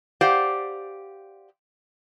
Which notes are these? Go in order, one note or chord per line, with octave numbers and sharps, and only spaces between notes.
G4 C5 D5 F5 F#5